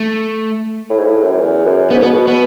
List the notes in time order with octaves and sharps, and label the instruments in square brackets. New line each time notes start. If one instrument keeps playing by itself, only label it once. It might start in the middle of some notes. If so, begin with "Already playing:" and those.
Already playing: [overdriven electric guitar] A3
[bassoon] A2
G#2
A2
F#2
E2
F#2
[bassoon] G#2 [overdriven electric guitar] B3
[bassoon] B2 [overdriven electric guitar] B3
[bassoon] B2
[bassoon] B2 [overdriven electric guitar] B3